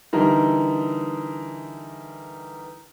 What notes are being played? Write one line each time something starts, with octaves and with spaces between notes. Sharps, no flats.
D3 E3 G3 D#4 A#4